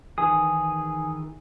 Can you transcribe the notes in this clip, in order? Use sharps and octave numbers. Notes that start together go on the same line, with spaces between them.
D#3 E3 G#4 G#5 D#6